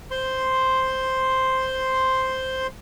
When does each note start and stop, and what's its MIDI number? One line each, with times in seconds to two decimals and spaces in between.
0.11 2.67 72
0.11 2.67 84